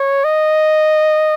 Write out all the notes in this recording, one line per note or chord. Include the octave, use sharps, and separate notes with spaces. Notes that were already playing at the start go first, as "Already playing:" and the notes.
Already playing: C#5
D#5